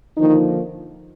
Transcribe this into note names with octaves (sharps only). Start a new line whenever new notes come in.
D3 D#3 F3 A#3 D#4